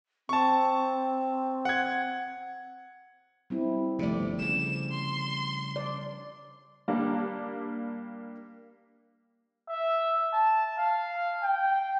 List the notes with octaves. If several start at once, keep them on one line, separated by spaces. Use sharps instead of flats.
C4 A5 C#6
F#5 G#6
G3 C4 E4
G1 C3 F3 A3 D5
C#3 G3 E7
C6
D5
G3 A#3 D4
E5
A5
F5
G5